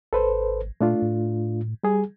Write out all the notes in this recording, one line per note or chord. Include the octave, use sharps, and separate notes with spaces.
G#1 A4 B4 C5
A#2 A3 D4 F4
A2
G3 G#4